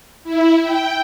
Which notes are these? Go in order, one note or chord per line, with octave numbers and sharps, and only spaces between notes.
E4
G5